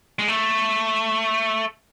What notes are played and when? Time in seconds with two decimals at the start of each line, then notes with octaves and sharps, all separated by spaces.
0.19 G#3
0.28 A3